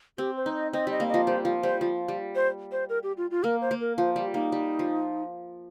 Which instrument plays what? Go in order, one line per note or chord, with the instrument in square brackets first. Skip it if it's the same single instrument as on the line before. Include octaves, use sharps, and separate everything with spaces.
[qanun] C4 [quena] G4
[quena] C5
[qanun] D#4
[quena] D#5
[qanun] C4 [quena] D#5
[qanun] G3 [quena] D#5
[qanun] A#3
[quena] D#5
[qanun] F3
[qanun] G3 [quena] C5
[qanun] F3
[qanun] G3 [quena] C5
[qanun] F3
G3
[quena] C5
C5
A#4
G4
F4
F4
[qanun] A#3 [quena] A#4
[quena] C5
[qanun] A#3
[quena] A#4
[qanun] F3 [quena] C5
[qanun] G3 [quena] G4
[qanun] A#3 [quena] D#4
[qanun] G3
F3